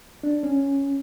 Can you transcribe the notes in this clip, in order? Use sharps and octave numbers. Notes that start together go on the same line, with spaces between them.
D4
C#4